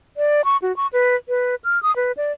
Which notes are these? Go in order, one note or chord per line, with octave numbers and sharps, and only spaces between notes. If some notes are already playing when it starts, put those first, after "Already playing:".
D5
C#6
F#4
C#6
B4
B4
F6
D#6
B4
D5